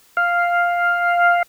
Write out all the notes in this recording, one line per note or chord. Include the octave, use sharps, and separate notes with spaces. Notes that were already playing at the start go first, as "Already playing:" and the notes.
F5